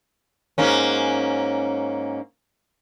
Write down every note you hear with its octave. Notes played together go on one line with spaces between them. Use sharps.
G#2 A#3 C#4